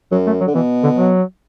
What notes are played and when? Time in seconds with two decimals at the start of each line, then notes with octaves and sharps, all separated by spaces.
0.11 F#2 F#3
0.27 A3
0.41 F#3
0.47 D3
0.54 B2 E3
0.83 D3
0.97 F#3